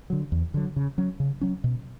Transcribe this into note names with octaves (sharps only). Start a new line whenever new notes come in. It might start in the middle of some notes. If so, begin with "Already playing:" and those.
D3 F#3
E2
D3 F#3
C#3
F#3 C#4
C#3
F#3 C#4
B2